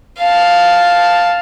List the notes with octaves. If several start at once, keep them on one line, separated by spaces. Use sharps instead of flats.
F5 A5